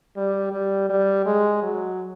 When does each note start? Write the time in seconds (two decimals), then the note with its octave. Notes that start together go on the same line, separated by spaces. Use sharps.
0.16 G3
0.52 G3
0.89 G3
1.26 G#3
1.62 F#3